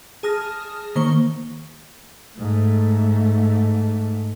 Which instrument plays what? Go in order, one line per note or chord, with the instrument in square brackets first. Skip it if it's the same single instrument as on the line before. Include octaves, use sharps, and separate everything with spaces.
[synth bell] G#4 A5 D#6 F6 A#6
D#3 A#3 C5 C#6 G7
[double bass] G#2 A3